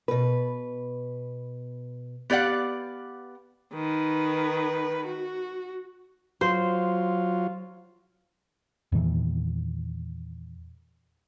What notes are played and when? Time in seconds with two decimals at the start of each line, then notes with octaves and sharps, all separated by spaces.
0.08 B2 B4
2.30 B3 G4 D5 F5 F#5
3.73 D#3 B4
5.06 F#4
6.41 F#3 F4 C5
8.92 E2 A#2 D#3 E3